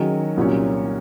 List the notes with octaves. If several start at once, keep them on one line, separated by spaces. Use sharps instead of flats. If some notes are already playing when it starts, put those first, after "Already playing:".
Already playing: D#3 F#3 C#4 G#4
C2 A#2 F#3 C#4